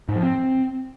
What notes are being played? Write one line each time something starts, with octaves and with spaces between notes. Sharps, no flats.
G#2
F3
C4